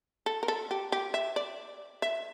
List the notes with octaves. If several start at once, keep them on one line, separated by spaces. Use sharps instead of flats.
A4
A#4
A4
G4
G4
E5
D5
E5